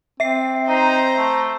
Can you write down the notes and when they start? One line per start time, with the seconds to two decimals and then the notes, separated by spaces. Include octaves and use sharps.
0.20 C4 E5 C7
0.68 D#4 C5 A#5
1.18 A3